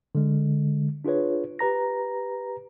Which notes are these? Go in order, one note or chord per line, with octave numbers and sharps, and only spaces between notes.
D3 G#3
D4 F4 G#4 B4 C#5
G4 B4 A#5 A#6